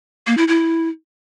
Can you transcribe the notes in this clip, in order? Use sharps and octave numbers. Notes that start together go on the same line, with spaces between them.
A#3
E4
E4